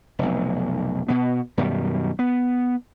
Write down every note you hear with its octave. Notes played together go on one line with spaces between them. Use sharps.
F1 B1
B2 B3
F#2 B2 D#3 G3
B3